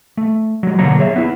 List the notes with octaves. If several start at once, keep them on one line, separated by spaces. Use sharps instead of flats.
A3
F#3 G#3
B2 D3 F#3 A#3 C#5 A#5
G#4 C#5 E5
B3 E4